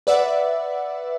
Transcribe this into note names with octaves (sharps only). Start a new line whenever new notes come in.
B4 D5 E5 F#5